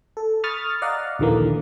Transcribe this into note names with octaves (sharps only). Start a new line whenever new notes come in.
A4
B5 C#6 D#6 F6 A6
D5 D#5 F5 F#5 A#5
A#1 D#2 D3 E3 A#3